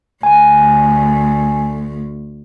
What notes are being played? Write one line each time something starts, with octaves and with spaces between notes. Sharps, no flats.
D2 G#5